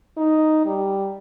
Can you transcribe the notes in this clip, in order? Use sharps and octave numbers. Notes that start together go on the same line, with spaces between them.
D#4
G3